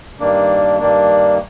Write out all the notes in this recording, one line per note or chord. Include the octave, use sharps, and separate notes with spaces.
G2 D#3 A#3 D4
G2 D#3 A#3 D4